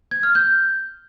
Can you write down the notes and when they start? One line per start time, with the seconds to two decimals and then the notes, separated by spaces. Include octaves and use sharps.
0.11 G#6
0.23 F6
0.35 G6